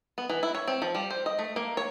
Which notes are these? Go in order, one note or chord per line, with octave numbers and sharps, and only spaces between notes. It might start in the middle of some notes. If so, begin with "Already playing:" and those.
B3
E3
E4
C#5
C4
F3
G3
C5
D#5
A3
A#3
C#5